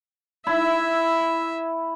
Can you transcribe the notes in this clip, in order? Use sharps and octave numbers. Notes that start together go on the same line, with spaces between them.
E4 E5